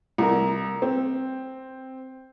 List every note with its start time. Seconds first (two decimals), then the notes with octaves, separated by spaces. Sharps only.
0.18 C2 A#4
0.82 C4